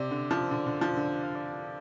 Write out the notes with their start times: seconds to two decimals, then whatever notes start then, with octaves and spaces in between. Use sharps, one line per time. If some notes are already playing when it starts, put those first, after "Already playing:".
Already playing: C3 D5
0.11 D3
0.31 F3
0.51 D3
0.67 D3
0.81 F3
0.97 D3
1.12 D5
1.23 F5
1.35 D5